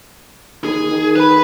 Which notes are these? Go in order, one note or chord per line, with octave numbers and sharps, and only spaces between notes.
D#2 G#4
D#3
B4 B5